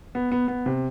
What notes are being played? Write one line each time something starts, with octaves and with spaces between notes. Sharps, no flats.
B3
B3
B3
C3